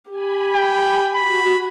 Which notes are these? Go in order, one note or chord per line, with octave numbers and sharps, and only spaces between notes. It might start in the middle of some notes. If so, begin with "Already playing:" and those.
G4 G#5 B5
G5
F#4 B5